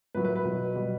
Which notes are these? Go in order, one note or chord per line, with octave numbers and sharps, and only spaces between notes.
A2 F#3 B4
B4
B4
B2 F#3
B2 G3